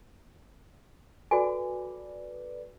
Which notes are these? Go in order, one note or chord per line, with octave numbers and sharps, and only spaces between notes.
F#4 A4 B4 D5 G#5